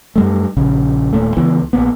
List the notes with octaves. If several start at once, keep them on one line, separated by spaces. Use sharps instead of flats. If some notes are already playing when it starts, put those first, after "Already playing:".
F#2 G3 A3
A#1 C#3
D#1 A#2 A3
C#2 E3 B3
A#1 F2 A#3 B3